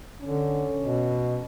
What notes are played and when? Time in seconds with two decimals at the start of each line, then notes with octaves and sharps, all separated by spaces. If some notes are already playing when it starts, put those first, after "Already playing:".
0.22 D3 C#4
0.83 B2